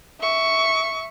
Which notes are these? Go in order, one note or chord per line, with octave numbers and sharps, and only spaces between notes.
E5 C#6